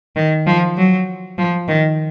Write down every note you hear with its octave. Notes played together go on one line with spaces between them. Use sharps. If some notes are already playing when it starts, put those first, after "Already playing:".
D#3
F3
F#3
F3
D#3